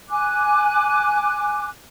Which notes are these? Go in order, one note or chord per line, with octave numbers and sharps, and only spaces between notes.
G#5 D6 F#6